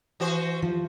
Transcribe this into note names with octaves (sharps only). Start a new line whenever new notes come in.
E3 F#4 C5
F3